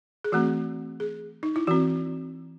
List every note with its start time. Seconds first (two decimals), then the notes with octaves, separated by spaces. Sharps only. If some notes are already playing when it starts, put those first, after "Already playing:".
0.24 G#4
0.32 E3 A3 C4 F#4
1.00 G#4
1.43 D#4
1.56 E4
1.67 E3 C4 F#4